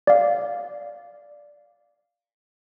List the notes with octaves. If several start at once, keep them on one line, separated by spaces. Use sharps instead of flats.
D5 F5